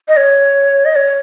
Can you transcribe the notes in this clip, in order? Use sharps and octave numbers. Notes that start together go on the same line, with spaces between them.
D#5
C#5
D#5
C#5